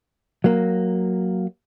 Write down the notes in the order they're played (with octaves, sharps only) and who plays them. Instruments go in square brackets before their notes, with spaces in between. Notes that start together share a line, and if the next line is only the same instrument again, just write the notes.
[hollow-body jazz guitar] F#3 A#3